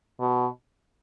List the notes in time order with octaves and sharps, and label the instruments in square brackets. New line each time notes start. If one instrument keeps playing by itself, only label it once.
[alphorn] B2